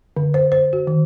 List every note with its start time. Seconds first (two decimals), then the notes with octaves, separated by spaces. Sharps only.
0.17 D3
0.34 C5
0.52 C5
0.73 F#4
0.87 D#3